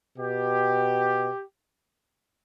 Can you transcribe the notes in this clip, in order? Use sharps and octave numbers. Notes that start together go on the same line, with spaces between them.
B2 G4